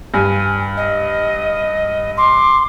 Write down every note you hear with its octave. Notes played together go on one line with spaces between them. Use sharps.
G2 G#5
D#5
C6 D6